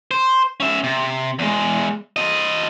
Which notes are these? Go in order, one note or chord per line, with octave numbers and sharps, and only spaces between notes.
C5
C#4 E5
C3
E2 G#3
C4 D#5